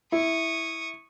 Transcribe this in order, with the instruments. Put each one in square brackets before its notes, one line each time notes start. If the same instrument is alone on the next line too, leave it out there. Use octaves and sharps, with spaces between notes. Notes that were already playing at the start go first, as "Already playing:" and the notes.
[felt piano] E4 [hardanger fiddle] C#6 D#6